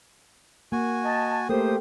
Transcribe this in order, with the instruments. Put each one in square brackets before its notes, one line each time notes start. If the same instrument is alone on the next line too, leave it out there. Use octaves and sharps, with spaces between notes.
[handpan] A#3 [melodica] F#4 G#5
[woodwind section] D#5 A5
[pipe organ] A3 G4 [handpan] A#3 A#4 [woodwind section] C5 [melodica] D#6